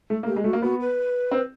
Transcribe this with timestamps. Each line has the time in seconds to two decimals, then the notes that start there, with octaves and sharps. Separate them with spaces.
0.10 A3
0.23 A#3
0.26 A3 G4
0.36 G#3
0.44 A3 F#4
0.53 A#3
0.62 B3 F#4
0.80 B4
1.31 C4